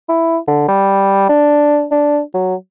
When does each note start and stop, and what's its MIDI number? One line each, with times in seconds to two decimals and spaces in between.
0.09 0.38 64
0.48 0.67 50
0.68 1.28 55
1.29 1.86 62
1.91 2.20 62
2.34 2.55 54